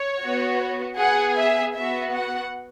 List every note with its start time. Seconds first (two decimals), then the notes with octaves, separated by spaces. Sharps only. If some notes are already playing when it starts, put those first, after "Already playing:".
Already playing: C#5
0.21 B3 F#4
0.98 B3 G#4 F#5
1.36 E5
1.75 B3 F#4 E5
2.14 F#5